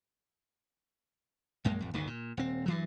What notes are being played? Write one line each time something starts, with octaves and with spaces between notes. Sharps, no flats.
A#1 F#2 G#3 A#3
A1 F2
G1 D2 D#3
A#2
D#1 C4
G2 E3 F#3